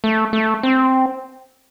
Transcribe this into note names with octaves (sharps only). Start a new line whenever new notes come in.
A3
A3
C4